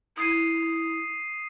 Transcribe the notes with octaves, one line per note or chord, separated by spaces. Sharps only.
E4 D#6 C7 D#7